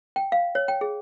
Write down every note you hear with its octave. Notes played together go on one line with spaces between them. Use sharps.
G5
F5
C#5
G5
G#4